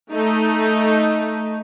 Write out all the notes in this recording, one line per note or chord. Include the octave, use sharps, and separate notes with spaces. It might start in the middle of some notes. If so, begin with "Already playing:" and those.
A3 D#4